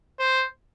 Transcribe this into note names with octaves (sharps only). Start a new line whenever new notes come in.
C5